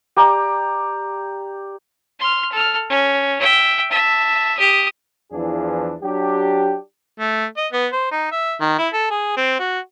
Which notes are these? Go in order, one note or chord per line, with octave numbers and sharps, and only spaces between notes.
G4 D5 A#5
C6 F6
A4 F6
C#4
E5 G5
E5 A5
G4 D#6
E2 E3 F3 D4 G#4
F#3 D4 G4
A3
D#5
B3
C5
D#4
E5
D#3
E4
A4
G#4
C4
F#4